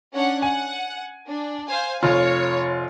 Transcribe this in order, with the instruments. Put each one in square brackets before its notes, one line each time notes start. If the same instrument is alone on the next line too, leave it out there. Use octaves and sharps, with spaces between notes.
[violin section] C#4 D4 F#5
[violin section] F#5 [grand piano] G#5
[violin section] D4
C5 F5 G#5
[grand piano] F1 F4 [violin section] C#5